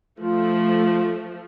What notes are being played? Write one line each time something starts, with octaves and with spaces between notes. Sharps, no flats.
F3 A3 F4